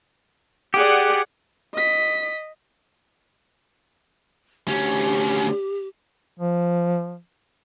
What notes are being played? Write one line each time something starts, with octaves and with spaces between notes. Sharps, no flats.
G4 G#4 D5 F#5
D#5 B6
D2 C#4 G4
F3